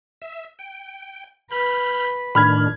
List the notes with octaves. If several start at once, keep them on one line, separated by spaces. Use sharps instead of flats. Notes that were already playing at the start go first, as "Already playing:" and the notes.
E5
G5
B4 B5 F6 G6
A2 D#3 D4 B5 F6 G#6